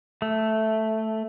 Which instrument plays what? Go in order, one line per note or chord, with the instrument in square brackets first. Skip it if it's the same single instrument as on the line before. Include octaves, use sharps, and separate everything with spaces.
[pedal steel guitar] A3